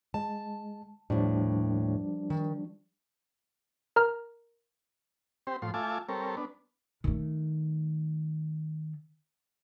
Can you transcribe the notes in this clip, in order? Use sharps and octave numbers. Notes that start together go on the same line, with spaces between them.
G#3 A5
D#2 A2 F3 G3 D4
D#3
A#4 A#5 F6
C4 G4 C5
A2 F3 C6
A3 F4 E5 G#5 A5 D6
G3 C4 A4 A#4 C#5
B3 D4
D#3 A3